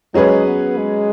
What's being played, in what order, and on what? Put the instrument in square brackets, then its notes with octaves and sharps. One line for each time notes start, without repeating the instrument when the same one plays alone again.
[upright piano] F#3 C#4 G#4 B4 [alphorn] G#3
[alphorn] B3
G#3